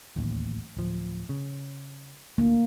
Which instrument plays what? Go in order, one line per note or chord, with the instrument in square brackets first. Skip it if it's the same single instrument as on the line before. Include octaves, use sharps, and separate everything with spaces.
[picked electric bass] D1 A1 D#2
D1 F3
C#3
[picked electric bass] D2 [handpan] A#3